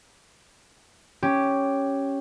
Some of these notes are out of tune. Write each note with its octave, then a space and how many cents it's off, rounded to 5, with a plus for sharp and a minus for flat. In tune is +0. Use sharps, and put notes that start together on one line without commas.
C#4 +0 G4 +0